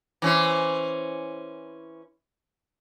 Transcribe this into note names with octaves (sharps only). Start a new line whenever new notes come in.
E3 C#4 C5